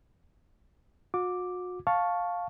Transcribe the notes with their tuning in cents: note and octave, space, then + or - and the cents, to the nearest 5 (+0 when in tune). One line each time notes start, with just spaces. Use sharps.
F#4 -40 D6 +0
F5 +10 A5 +0 C#6 +0